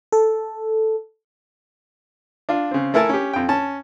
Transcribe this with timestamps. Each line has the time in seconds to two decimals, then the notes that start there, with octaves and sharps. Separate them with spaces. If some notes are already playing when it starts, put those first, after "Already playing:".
0.12 A4
2.49 D4 F4
2.71 C#3 C4
2.94 A3 E4 A4 A#4 G#5 A5
3.09 C#4 G4
3.33 F2 G5
3.49 C#4 A5